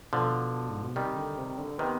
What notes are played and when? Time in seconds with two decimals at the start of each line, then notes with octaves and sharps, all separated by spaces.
0.13 B2 D3 F3
0.69 G#2
0.83 B2
0.96 C3 D#3 G3
1.16 D3
1.38 C3
1.58 D3
1.78 C3 D#3 B3